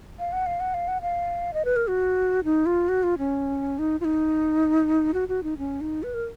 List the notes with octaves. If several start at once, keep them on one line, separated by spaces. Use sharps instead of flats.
F5
F#5
F5
F#5
F5
F#5
F5
D#5
B4
A#4
F#4
D#4
F4
F#4
F4
C#4
D#4
F4
D#4
F#4
F#4
D#4
C#4
D#4
B4
A#4